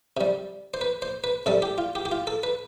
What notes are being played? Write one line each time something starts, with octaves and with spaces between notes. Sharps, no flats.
C3 G3
C5
B4
C5
B4
C3 G3 A4
G4
F4
G4
G4
F4
A4
B4